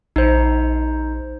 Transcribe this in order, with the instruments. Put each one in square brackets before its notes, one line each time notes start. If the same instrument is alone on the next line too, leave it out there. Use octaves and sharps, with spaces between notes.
[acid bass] A#1 [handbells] D#4 C5